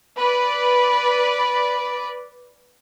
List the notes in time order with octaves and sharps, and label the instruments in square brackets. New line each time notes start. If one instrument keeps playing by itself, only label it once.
[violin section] B4 D5